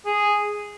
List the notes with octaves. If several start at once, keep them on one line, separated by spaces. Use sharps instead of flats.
G#4